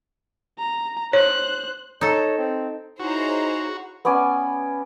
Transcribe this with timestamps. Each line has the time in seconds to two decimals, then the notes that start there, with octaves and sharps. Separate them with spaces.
0.58 A#5
1.13 C5 C#5 F#6
2.01 D#4 A4 C#5
2.38 C4
3.00 D#4 E4 F#4 G#4 C5 C#5 A#5
4.05 B3 C#4 D5 G#5